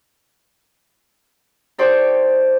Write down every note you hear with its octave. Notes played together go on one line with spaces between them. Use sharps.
D#4 G4 A4 C5 D5 C#6